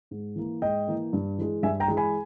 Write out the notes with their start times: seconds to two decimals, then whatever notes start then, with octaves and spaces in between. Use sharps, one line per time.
0.11 G#2
0.36 E3 A#3
0.62 G#2 D#5 G5
0.87 E3 A#3
1.13 G2
1.38 E3 G#3
1.63 G2 E5 G#5
1.80 G5 A#5
1.88 E3 G#3
1.97 G#5 B5